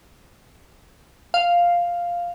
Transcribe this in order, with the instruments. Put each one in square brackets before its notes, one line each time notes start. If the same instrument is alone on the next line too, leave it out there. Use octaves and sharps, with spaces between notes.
[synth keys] F5